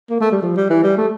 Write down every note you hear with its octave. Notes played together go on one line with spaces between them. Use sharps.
A#3
A3
G3
F3
G3
E3
G3
A3